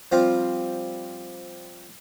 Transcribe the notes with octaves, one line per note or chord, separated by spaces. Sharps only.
F3 G3 C4 F4